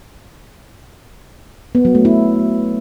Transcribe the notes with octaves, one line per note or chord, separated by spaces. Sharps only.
B3
F#3
A3
E4